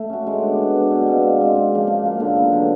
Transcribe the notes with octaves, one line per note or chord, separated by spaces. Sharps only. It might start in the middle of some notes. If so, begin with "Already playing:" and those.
Already playing: A3
C#4 F#4
G#3
B3 D4
G#3
B3 D4
B2
G#3 C4 F4
B2
G#3 C4 F4
C#3
F3 A#3
C#3
F3 A#3
D3
F#3 B3
D3